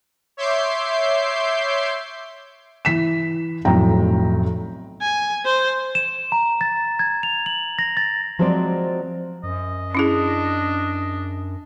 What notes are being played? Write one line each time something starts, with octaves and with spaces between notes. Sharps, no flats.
C#5 E5 C6 D6 G6 C7
E3 B6 E7
F1 B1 A2 G5 A#5
G#5
C5
E7
A#5
A6
G#6
F7
F#7
A#6
A6
F3 F#3 G#3 C4 C5 D5
F#2 D#5
C#4 D4 E4 G#4